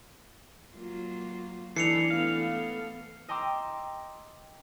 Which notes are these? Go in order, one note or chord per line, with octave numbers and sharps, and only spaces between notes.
F#3 A#3 F4
E3 D4 D#4 A4 C7 C#7 F7
A3 B3 A4 F5
D#5 G5 A#5 C6 D6 E6